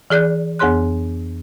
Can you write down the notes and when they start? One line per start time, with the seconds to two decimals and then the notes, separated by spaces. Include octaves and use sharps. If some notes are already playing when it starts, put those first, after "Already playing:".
0.10 E3 G#4 D5 F#6 G6
0.59 F2 B3 G#4 C#5 C6 F#6